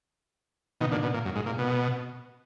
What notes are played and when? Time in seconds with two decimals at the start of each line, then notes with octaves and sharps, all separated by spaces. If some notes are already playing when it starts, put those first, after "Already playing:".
0.81 B2 D#3
0.92 A#2 D3
1.03 B2
1.14 A#2
1.25 F#2
1.36 G#2
1.46 A#2
1.58 B2